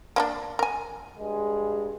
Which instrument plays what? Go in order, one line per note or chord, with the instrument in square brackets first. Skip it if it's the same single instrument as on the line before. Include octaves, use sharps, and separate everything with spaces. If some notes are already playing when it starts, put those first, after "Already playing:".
[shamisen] A#3 C#4 D4
A#4 G#5
[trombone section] G2 G#3